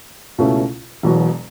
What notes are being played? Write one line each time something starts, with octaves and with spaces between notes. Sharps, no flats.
C#2 B2 A3 C#4 E4
E1 E2 B2 F#3